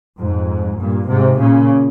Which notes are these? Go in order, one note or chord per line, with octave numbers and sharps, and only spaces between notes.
F2 G#2
G2 A#2
G#2 C3
A#2 C#3